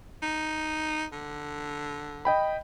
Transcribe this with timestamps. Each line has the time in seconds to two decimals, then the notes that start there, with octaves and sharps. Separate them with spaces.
0.22 D#4
1.12 D3
2.25 D#5 G5 B5